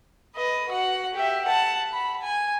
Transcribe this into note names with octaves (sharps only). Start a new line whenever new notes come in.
B4 D#5
F#4 F#5
G4 E5
F#5 A5
B5
G#5